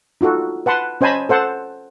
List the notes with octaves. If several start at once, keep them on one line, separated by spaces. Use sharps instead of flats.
D#4 F4 F#4 A4
B4 F#5 A5 C6
C#4 C5 D#5 G#5 A5 B5
A4 C5 F#5 A5